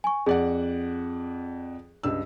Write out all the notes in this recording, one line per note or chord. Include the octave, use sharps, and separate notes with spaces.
G#5 C#6
F2 G#4 D5 F#5
C#2 G2 E6